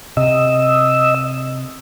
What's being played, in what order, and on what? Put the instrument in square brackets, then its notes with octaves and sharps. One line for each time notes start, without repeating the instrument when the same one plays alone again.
[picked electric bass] C3 [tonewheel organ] D#5 E6